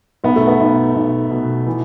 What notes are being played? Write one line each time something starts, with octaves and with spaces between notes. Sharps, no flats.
B1 B3
A3
B3
B1
B1
B2
E3